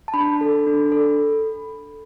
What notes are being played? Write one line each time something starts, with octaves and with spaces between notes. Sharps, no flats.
A5
D4 B5
A4
D4
A4